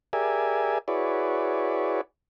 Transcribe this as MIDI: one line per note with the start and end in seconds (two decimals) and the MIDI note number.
0.13 0.78 67
0.13 0.78 68
0.13 0.78 70
0.13 0.78 74
0.13 0.78 76
0.13 0.78 80
0.88 2.01 64
0.88 2.01 66
0.88 2.01 68
0.88 2.01 71
0.88 2.01 73
0.88 2.01 74